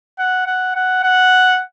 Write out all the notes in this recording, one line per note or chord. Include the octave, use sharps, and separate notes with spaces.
F#5
F#5
F#5
F#5